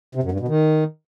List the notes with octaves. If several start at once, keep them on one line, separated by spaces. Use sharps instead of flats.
C3
F#2
G2
B2
D#3